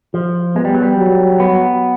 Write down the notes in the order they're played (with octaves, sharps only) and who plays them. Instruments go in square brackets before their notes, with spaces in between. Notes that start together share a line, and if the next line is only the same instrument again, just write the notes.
[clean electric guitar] F3
[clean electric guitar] G#3 [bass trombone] B3
[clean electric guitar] G3
F#3
G3
[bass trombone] F#3
[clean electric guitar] B3